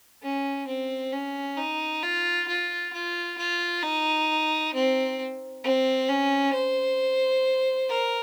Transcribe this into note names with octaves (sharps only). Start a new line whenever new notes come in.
C#4
C4
C#4
D#4
F4
F4
F4
F4
D#4
C4
C4
C#4
C5
A#4